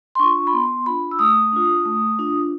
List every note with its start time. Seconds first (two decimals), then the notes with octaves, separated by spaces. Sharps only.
0.15 C6
0.19 D4 F4 C#6
0.47 B5
0.53 B3 C6
0.86 D4 F4 B5
1.11 E6
1.19 A3 D#6
1.53 D4 F4
1.85 A3
2.19 D4 F4